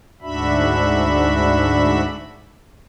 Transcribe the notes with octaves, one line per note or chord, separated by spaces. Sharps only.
D2 G#2 D4 F#4 E5 B5